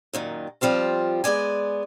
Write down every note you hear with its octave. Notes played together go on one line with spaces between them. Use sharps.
F#2 A#2 D#3
F3 G3 C4 F4
G#3 B3 D5 G#5